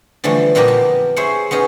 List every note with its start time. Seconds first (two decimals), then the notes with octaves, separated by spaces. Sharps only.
0.24 D3 E3 F3 G3 A3
0.55 F2 A#2 A#3 B3 G4 A#4
0.68 A5
1.16 E4 G#4 C5 C#5 F#5
1.51 B3 C#4 D#4 G#4